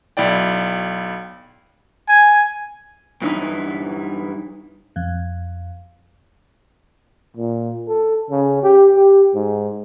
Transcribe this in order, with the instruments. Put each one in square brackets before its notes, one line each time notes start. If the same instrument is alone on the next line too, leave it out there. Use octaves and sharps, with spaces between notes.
[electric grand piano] B1 E4 D5 G5
[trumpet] G#5
[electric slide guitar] G2 E3 C4 D#4 E4
[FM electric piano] F2
[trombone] A#2
A4
C#3
G4
G4
G#2